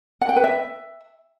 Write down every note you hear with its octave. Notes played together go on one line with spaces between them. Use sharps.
F#5
G5
B4
E5